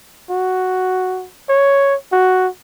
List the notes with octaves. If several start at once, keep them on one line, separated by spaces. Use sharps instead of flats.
F#4
C#5
F#4